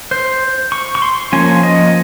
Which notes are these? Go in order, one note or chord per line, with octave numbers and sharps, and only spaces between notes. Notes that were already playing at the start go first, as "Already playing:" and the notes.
C5
C#6
C#6
C6
F3 A#3 C#4 G#5
D#5